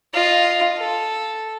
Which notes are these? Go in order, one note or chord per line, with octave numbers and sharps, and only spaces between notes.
F4 D#5
A4